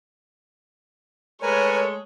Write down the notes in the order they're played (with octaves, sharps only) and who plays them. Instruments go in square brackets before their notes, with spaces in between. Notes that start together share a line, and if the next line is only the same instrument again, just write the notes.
[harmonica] G#3 A3 [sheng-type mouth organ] A#4 B4 G#5 [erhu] C#5